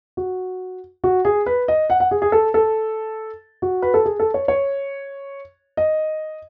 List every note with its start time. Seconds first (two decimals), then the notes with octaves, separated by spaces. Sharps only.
0.17 F#4
1.04 F#4
1.25 G#4
1.46 B4
1.68 D#5
1.90 F#5
2.00 F#5
2.11 G#4
2.22 G#4
2.32 A4
2.54 A4
3.62 F#4
3.82 B4
3.94 A4
4.05 G#4
4.20 A4
4.34 C#5
4.48 C#5
5.77 D#5